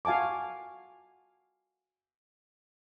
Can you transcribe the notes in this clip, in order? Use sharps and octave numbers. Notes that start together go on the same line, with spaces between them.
F#4 F5 G#5 A5 D6